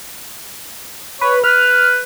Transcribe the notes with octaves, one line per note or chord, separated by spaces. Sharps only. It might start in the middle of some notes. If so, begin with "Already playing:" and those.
B4 C#5
B4 F6